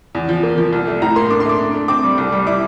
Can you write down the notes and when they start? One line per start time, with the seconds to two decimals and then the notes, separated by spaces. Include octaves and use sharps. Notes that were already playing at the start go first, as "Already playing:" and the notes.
0.15 E2
0.29 F3
0.43 A#3
0.58 F3
0.73 C2
0.87 A3
1.02 A2 A#5
1.16 A#3 C6
1.30 D4 D6
1.40 C6
1.45 A3 D6
1.60 D4
1.74 A3
1.88 C4 D6
2.03 G3
2.18 C2
2.32 G3
2.47 E4 D6